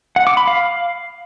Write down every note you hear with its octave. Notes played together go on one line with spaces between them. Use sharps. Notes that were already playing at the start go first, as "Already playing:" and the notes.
F#5
D6
B5
F5